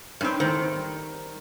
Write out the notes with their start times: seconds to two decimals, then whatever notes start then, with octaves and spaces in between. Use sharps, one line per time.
0.21 G2 C4 C#4 D#4 B4
0.40 E2 D#3 A3 C5
0.72 G3 D#4